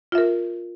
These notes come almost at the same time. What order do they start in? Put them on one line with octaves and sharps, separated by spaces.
F4 E5 A#4